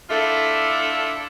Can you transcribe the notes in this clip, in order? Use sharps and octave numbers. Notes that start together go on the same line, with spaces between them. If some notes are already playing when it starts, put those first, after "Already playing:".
A3 D4 E4 F4 A4 E5